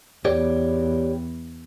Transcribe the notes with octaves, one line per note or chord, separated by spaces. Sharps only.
E2 G4 C#5 D5